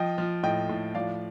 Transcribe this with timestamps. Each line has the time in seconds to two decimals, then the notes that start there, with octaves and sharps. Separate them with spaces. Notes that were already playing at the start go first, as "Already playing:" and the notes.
Already playing: F3 D#5 G5
0.18 F3
0.43 A2 D#5 G5
0.69 A2
0.95 F3 D5 F5